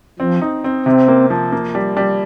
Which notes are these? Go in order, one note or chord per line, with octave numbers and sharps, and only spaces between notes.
F3 C4
D#4
C4
C3 C4
A#3
F3
A#3
G3
G3